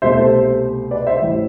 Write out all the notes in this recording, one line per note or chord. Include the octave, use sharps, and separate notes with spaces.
C2 B2 A3 C5 E5
A4 C5
B4 D5
C5 E5
A1 A2 E3